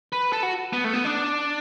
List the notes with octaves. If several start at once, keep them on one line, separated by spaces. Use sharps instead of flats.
B4
A4
F#4
B3
A3
B3
D4